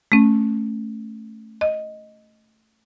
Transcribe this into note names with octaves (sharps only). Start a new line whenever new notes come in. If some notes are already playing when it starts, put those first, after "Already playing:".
A3 C#4
D#5